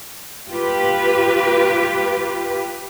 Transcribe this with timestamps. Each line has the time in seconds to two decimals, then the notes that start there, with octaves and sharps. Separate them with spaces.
0.49 F4 G4 B4